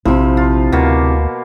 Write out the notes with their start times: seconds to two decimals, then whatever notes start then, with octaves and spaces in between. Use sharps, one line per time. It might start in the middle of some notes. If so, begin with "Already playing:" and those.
0.05 A#1 C3 F3 E4
0.37 F4
0.72 D2 B2 A#3 A5